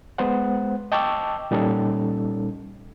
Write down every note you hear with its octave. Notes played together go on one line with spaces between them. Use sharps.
G#3 B3 B4 C5 F#5
D#5 G5 A5 C#6 D6 E6
A#2 G3 C#4 D#4 A4